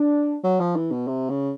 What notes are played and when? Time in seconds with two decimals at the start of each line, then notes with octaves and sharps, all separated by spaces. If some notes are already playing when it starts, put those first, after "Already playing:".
Already playing: D4
0.44 F#3
0.60 F3
0.76 E3
0.91 B2
1.07 C3
1.29 C#3